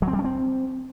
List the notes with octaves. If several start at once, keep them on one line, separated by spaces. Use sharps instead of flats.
F#3
C4
G3
C#4
C4